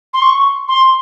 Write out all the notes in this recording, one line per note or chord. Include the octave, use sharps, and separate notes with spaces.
C6
C#6
C6